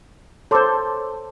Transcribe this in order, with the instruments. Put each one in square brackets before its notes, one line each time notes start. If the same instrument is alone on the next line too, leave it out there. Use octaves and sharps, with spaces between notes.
[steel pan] A4 C5 [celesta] C#5 C6 D6